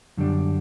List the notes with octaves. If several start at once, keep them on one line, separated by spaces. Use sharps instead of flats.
F#2 D3 G3 D4